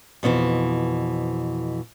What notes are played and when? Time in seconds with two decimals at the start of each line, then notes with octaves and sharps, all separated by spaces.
0.23 F2 B2 D#3 E3